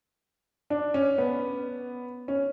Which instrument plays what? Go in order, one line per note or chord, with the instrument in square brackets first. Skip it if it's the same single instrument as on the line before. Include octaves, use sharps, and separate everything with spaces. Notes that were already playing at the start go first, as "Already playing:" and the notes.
[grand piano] D4
C#4
B3
C#4